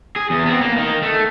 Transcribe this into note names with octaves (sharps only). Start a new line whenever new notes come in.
G#4
E2
B3 C4
A#3
D#3
A3